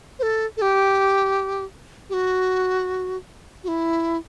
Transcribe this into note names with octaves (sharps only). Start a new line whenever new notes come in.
C5
A4
A4
G4
G4
F#4
F#4
E4